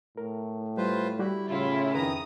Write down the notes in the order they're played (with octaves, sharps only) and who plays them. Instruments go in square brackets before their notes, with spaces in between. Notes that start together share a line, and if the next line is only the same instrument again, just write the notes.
[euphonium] A2 [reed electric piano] A#4
[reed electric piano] G3 [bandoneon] F4 B4 C5
[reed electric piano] G3 F#4 G4 [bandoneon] E4
[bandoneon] A2 [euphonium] C#3 [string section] E4 F4
[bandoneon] F2 D#3 A#5 [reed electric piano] B4 [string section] D#6